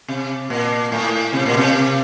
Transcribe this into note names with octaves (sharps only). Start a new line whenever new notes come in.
C3
A#2
A2
C3
A#2
C3